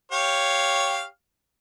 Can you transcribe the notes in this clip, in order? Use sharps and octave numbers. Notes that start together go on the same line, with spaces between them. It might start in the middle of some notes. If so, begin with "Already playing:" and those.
G4 C#5 F5